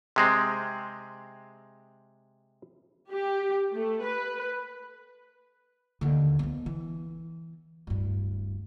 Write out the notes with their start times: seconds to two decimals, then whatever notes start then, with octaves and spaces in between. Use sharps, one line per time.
0.16 C3 G#3 C4
3.11 G4
3.74 A3
4.03 B4
6.01 D#2 D3
6.39 F3 B3
6.66 E3
7.87 D1 G2